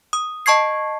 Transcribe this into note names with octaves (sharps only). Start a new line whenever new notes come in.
D#6
D#5 A5 C#6 G#6 C7